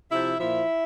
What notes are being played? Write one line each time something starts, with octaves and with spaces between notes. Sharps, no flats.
C3 F3 E4 E5
A#2 F3 E4 E5